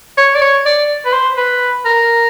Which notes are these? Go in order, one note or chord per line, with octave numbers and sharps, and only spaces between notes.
C#5
D5
C#5
D5
B4
C5
B4
A#4